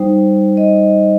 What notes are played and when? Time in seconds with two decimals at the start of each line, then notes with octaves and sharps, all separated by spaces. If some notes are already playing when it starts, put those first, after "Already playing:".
Already playing: G3 D#4 C5
0.57 D#5